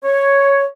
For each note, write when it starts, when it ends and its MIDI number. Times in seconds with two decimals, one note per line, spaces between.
0.04 0.65 73